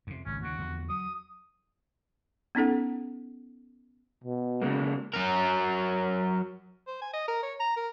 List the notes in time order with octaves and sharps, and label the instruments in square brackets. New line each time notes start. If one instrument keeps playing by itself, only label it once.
[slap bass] F2 C3
[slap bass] G#1 C#2 [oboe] C#4
[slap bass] D#2 C#3 [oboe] F#4
[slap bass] E2 D3 F3
[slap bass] F#3 [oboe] D#6
[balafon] B3 C#4 D#4 A4 F#5
[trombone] B2
[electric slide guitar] C#3 G#3 A#3
[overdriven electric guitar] F#3 A#4
[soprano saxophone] C5
G#5
D#5
A#4
C#5
A#5
A#4